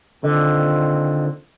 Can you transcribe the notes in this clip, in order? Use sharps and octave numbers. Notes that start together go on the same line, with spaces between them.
A#2 D3 D#3 C4